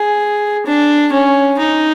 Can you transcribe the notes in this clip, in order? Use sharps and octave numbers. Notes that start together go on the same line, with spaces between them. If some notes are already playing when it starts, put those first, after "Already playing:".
Already playing: G#4
D4
C#4
D#4